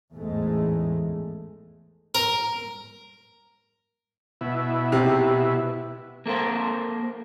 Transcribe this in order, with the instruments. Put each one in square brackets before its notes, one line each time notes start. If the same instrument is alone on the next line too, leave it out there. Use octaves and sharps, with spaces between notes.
[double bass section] A1 E2 G#2 G#3 A3
[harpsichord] A#4
[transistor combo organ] B2 E4
[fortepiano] C3
[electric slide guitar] A#3 A4 A#4 C5